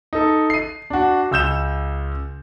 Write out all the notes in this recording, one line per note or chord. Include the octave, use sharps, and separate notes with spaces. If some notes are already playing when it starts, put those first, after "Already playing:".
D#4 A4
C7 D#7
D4 F#4
C#2 E6 G6 E7